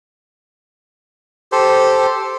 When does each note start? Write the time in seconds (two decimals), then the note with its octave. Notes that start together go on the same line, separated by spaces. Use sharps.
1.52 G4 A4 C5